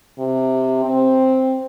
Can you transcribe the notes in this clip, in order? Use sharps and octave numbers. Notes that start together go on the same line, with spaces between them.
C3
C4